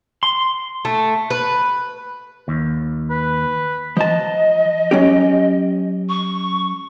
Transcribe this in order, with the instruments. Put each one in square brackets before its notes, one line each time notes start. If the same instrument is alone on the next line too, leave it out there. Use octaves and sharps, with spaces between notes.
[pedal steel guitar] C6
[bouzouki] A3
B4
[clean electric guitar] D#2
[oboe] B4
[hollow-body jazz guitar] F3 A5 [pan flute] D#5
[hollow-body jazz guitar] F#3 C#4 G4
[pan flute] C#6